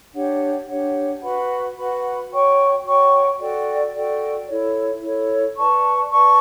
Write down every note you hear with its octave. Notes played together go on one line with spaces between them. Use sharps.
D4 G4 C#5 F#5
D4 G4 C#5 F#5
F#4 B4 F#5 B5
F#4 B4 F#5 B5
F#4 C#5 G5 C#6
F#4 C#5 G5 C#6
F#4 A4 D5 G5
F#4 A4 D5 G5
E4 A4 C#5
E4 A4 C#5
B4 D5 A5 C#6
B4 D5 A5 C#6